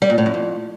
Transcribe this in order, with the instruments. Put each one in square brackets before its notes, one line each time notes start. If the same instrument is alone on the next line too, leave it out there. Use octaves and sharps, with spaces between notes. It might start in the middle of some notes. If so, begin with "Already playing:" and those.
[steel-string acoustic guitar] G3
A#2
A2
F#2
F2